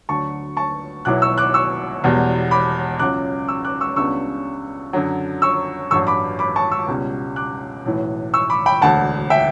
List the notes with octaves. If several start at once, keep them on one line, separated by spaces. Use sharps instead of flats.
D2 D3 F#3 A5 C#6
A5 C#6
B1 B2 F#3 B3 E4 D6 F#6
C#6 E6
D6 F#6
C#6 E6
E1 E2 B2 G3
B5 D6
C#2 C#3 F#3 D6 F#6
C#6 E6
D6 F#6
C#6 E6
C#2 C#3 G3 B3 D4 C#6 E6
F#2 D3 F#3
C#6 E6
A1 G2 F#3 C#6 E6
B5 D6
B5 D6
A5 C#6
C#6 E6
C#2 B2 G3 C#4
D6 F#6
B1 A2 E3
C#6 E6
B5 D6
G5 B5
E1 D2 D3 F#5 A5
E5 G5